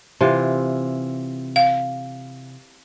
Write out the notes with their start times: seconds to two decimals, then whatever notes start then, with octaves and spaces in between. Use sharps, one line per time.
0.21 C3 E3 F4
1.56 F5